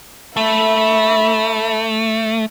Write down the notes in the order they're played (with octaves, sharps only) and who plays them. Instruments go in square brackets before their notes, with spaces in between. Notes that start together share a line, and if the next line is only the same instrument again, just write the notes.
[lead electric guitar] A3 [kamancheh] E5 B5